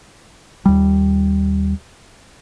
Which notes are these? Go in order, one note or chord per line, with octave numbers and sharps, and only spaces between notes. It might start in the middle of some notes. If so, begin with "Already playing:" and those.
D#2 G3